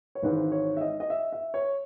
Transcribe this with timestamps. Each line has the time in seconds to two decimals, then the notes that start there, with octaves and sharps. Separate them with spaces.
0.15 C#5
0.22 G#1 G#2 E3 B4
0.52 C#5
0.77 E5
0.81 D#5
1.00 D#5
1.10 E5
1.32 E5
1.54 C#5